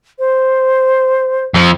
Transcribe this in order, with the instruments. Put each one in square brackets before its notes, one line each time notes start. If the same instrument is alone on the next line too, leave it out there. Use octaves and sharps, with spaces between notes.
[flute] C5
[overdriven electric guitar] F2 F3